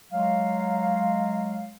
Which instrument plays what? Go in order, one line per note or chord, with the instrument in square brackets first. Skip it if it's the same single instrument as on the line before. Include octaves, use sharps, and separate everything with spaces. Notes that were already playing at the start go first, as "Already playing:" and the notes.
[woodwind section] F#3 G#3 F5